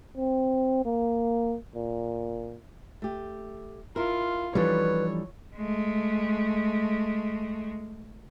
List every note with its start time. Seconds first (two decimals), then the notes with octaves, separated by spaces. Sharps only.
0.17 C4
0.85 A#3
1.75 A#2
3.02 A3 G4
3.96 E4 F4 A#4
4.55 E3 F3 G3 D4 D#4 A4 B4 C#5
5.56 G#3 A3